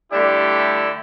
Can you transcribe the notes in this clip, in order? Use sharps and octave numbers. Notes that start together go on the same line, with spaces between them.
D3 G3 A3 D4 E4 G4